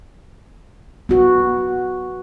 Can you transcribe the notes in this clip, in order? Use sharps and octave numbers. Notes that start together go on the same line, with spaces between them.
B3 F#4